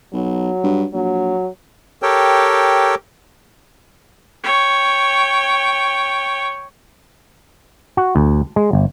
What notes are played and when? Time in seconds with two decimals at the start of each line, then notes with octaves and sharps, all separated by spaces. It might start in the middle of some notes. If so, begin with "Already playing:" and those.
0.13 B1 F#3
0.63 G2
0.93 A#1 F#3
2.02 G4 A4 A#4 C#5 G5
4.44 C#5 G5
7.97 F#4
8.16 D2
8.56 G#3
8.73 G1